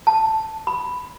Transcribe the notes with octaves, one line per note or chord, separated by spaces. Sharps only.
A5
B5